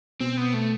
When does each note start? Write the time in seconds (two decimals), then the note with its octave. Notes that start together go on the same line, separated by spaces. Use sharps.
0.20 B2 C4
0.37 B3
0.54 A3